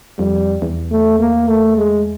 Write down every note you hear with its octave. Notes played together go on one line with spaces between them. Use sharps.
F2 G3
E2
A3
A#3
A3
G#3